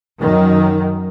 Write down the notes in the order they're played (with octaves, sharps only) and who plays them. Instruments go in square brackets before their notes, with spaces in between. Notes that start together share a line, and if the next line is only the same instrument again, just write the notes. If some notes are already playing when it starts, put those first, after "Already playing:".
[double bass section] F#2 D#3